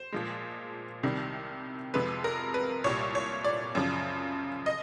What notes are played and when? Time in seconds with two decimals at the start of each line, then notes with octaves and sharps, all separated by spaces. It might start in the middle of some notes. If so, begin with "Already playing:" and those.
Already playing: C5
0.12 A#2 F3 G#3
1.03 C2 C3 D#3 G3
1.94 F2 C3 F3 G#3 B4
2.24 A#4
2.54 B4
2.84 C2 A#2 G3 C#5
3.15 C#5
3.44 D5
3.75 F#2 C#3 F3
4.66 D#5